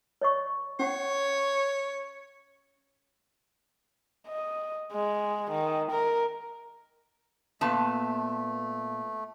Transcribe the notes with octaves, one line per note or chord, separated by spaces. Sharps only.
C#5 D#5 C#6
C#4 C#5 F#5
D#5
G#3
D#3
A#4
A#2 A3 B3 A5